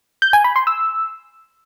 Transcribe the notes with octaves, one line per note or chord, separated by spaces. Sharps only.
G6
G#5
B5
C6
E6